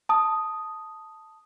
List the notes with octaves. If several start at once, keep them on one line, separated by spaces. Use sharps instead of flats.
A5 D#6